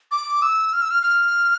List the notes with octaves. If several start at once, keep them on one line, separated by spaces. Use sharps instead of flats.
D6
E6
F6
E6
F6
F6